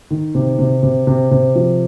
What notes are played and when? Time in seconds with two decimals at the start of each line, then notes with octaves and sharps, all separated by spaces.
0.11 D#3
0.35 C3
0.59 C3
0.83 C3
1.07 C3
1.31 C3
1.56 F3